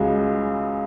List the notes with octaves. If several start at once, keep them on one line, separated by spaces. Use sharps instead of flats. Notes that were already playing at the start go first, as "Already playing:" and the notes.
Already playing: C#2 C#3 G#3 F#4